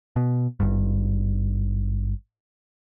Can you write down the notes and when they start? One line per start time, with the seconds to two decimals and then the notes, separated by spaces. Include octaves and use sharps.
0.16 B2
0.60 G#1 G2